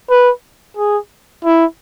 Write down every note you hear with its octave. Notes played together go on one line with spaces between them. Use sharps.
B4
G#4
E4